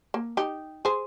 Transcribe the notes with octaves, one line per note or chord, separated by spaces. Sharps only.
A#3
D#4 G4
G#4 C5